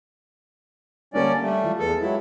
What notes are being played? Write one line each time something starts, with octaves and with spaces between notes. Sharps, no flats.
D3 G3 A#3 C#4 D4 D5
G3 A3
E3 F3
E2 G#4 A4 B4
F#3 G#3 E4 F4 G4